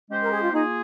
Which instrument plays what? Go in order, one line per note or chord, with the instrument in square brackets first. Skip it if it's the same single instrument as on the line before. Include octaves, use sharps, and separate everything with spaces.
[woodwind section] G#3 C#4 G4 C5
[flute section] A#4
G#4
F4
[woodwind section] A#3 F4 G#4 [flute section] D#4